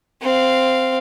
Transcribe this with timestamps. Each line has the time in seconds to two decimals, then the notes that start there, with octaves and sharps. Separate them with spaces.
0.22 C4 F5